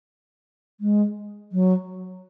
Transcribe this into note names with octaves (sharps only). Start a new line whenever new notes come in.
G#3
F#3